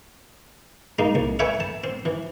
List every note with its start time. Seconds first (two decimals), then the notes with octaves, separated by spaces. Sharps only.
0.99 G#3 A#3 D#4
1.15 C2
1.39 A4 B4 C#5 E5 G5 G#5
1.60 A5
1.84 C4
2.05 E3